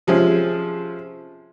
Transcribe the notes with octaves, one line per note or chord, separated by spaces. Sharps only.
C3 F3 G#3 C#4 F4 G#4